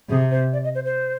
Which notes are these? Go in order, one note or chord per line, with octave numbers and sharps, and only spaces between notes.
C3 G#4
C5
D5
D#5
C5
C5